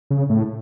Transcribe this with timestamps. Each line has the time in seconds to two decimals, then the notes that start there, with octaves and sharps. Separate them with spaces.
0.11 C#3
0.30 A2